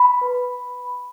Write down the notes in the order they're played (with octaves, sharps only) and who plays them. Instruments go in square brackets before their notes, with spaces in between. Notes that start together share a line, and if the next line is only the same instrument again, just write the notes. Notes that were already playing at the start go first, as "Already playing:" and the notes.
Already playing: [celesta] B5
B4